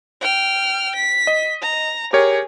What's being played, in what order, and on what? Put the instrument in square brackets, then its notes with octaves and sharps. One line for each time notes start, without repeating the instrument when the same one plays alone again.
[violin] G5 F6
B6
[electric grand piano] D#5
[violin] A#5
[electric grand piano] G4 A#4 C#5 [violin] G#4